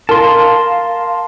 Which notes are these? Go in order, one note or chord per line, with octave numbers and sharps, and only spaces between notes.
A#4 F5 A5 C6